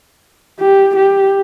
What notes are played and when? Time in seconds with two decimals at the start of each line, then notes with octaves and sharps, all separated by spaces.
0.59 G4
0.96 G4